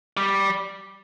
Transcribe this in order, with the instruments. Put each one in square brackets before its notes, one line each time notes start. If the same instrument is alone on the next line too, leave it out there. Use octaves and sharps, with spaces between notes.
[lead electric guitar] G3